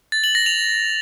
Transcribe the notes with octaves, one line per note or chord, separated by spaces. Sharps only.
A6
F#7
A#6
F7